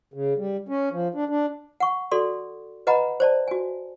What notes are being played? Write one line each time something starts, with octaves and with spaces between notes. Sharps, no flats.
C#3
G3
C#4
F3
D4
D4
F#5 C#6
F#4 A4 D5 C6
B4 D#5 F#5 A#5 B5
C5 D5 A5
F#4 G#5